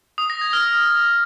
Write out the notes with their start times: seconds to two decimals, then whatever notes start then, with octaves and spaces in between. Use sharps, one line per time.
0.18 D#6
0.30 A#6
0.41 G#6
0.53 F6